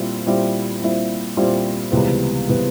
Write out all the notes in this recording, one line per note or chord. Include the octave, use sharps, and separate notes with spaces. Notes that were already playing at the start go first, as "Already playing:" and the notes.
Already playing: A#2 G3 C4 E4
A#2 G3 C4 E4
A#2 G3 C4 E4
A#2 G3 C4 E4
C#2 C3 E3 G3 B3
C3 E3 G3 B3